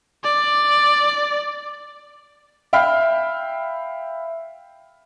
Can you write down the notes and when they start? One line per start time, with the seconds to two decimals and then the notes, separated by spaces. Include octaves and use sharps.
0.24 D5
2.73 E5 F5 G5 B5 F6